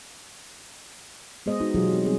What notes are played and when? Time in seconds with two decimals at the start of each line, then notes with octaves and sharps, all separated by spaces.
1.46 G#3 B3 G#4 C5 D#5
1.60 D#4 F#4
1.75 B2 E3 F#3 F4 G4 G#4
1.92 C4
2.05 G3 C4 G#4